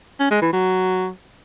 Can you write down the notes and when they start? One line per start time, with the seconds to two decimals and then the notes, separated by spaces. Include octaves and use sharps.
0.20 C#4
0.31 G#3
0.42 E3
0.53 F#3